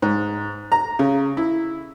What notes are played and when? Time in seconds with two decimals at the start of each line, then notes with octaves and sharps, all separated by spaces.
0.02 G#2
0.72 A#5
0.99 C#3
1.37 E4